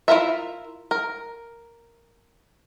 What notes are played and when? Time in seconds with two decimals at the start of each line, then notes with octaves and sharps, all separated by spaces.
0.08 E4 F4 A#4 E5
0.91 A#4